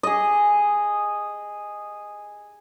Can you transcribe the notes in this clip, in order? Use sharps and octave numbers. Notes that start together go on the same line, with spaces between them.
G#4 D#5